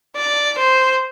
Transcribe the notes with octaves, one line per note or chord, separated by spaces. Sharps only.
D5
C5